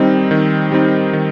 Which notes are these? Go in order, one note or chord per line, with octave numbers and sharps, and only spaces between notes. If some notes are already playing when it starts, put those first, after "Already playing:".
Already playing: D#3 G3 C4 D#4
D#3
G3 C4 D#4
D#3